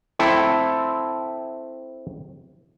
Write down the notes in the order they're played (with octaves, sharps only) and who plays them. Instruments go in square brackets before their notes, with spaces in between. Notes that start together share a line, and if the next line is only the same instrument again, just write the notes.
[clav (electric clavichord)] C4 E4 A4